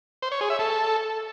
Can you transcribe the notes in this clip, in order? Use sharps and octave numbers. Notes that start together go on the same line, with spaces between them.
C5
C#5
G#4
E5
A4